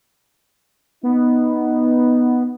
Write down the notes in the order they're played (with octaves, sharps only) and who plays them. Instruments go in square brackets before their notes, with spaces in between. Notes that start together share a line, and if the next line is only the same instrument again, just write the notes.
[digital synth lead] B3 [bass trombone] D#4